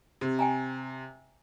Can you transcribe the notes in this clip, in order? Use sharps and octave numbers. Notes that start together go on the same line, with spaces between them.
C3
G5 G#5 A#5